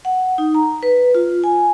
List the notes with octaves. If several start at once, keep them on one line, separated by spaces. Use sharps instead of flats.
F#5
D#4
A#5
B4
F4
G#5